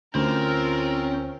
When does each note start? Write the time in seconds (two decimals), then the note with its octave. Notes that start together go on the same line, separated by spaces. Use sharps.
0.15 D2 C4 C#4 F4 A#4